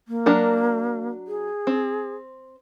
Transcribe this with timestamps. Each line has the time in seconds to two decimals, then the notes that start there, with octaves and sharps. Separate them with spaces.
0.08 A#3
0.26 F#3 D4 A#4
1.28 G#4
1.67 C4